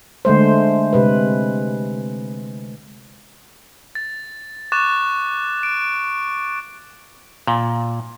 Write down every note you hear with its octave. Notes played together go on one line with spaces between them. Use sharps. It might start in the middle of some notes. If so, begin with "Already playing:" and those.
D3 G#3 A3 C5
C3 G#3 B4
A6
C#6 D6 F#6 A6 E7
D7
A#2